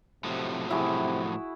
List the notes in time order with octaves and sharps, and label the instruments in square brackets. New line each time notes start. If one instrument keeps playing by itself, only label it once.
[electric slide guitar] A2 F3 F#3 [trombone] C3
[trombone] C3 [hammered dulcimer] E4 F#4 G#4